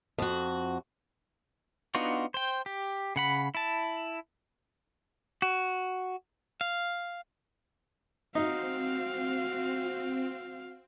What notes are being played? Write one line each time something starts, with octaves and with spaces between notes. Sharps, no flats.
F2 F#4
B3 D4 D#4 F4 F#4
C5 G5
G4
C#3 F#5 B5
E4 A5
F#4
F5
C4 D#4 F#4 F5